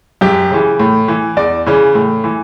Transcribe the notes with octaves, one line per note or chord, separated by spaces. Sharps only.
F#2 G4
C#3 E3
A2
E3
E2 D5
C#3 E3
A2
E3